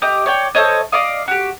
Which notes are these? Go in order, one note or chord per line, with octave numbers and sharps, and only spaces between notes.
G4 D#5 D6
C#5 D5 G5
A4 C5 C#5 D#5
D5 D#5 F5 D#6
F#4 G4